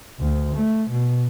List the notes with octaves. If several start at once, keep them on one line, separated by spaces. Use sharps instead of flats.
D2
A3
B2